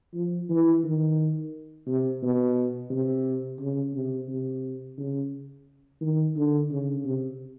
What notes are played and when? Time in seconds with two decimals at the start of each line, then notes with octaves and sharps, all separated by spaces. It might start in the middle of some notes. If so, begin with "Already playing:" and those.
0.14 F3
0.50 E3
0.84 D#3
1.87 C3
2.22 B2
2.90 C3
3.60 C#3
3.94 C3
4.29 C3
4.98 C#3
6.01 D#3
6.36 D3
6.71 C#3
7.05 C3